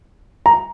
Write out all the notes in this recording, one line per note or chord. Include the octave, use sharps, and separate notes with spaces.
A#5